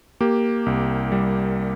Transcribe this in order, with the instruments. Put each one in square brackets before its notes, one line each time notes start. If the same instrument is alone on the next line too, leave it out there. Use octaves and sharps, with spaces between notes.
[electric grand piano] A#3 G4
C2
G3